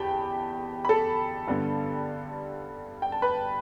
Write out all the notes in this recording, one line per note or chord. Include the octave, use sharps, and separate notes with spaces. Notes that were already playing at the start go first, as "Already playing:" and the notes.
Already playing: E2 G4 G5 A5 B5
B5
A4 A5
G2 D3 G3 B3
G5
A5
B4 B5